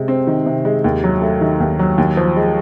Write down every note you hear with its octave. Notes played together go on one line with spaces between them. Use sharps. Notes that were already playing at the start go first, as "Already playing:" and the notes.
Already playing: C3 G#3
C4
D#3
C3
G#3
D#2
F#3
A3
D#3
D#2
F#3
D#2
F3
G#3